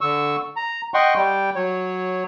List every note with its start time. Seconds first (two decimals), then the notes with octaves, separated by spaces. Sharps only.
0.01 D3 C#6 E6
0.56 A#5
0.94 D#5 F#5 G5 C6 C#6
1.15 G3 G5
1.55 F#3 C#5